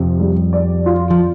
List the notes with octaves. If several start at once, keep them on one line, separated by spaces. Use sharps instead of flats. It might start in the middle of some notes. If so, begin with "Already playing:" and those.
Already playing: F2 C3
G3
D5
F4
F3